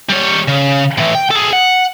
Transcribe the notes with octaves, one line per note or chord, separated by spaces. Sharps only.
G3 C#5
C#3
A2 E3
G5
G#4 A4
F#5